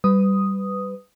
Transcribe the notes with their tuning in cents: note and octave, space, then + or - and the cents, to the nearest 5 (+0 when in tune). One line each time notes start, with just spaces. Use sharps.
G3 -10 B4 +20 D#6 +0